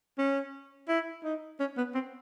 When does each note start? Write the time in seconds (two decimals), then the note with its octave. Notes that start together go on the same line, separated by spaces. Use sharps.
0.18 C#4
0.89 E4
1.24 D#4
1.60 C#4
1.77 B3
1.95 C4